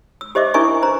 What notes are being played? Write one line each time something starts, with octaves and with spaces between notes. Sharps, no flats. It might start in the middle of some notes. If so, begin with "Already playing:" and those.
E6
G4 C5 D#5 E5 D6
D4 E4 A#4 E5 G#5 C#6
B4 C5 A#5